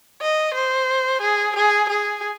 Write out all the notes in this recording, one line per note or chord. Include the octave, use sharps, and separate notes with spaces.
D#5
C5
G#4
G#4
G#4